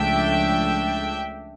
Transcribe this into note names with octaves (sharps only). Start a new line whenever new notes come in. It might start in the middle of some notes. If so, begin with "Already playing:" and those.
Already playing: C#2 C#3 F3 A3 D4 E5 G5